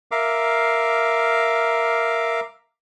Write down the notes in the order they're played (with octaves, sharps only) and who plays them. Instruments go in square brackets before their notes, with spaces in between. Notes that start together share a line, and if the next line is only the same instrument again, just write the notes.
[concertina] A#4 E5 F5 D6